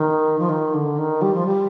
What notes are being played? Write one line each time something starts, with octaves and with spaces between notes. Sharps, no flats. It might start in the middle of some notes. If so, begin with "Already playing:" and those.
Already playing: D#3
F3
D#3
D3
D#3
G3
F3
G3